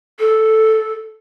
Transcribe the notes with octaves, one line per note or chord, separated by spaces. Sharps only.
A4